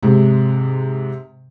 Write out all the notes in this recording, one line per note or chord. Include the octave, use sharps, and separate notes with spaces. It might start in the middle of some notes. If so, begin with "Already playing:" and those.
G#2 C3 G#3